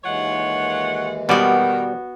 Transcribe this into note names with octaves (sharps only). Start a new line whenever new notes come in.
D#2 E3 G#3 F4 C#5 F#5
B2 D#3 G3 B3 F#4 D5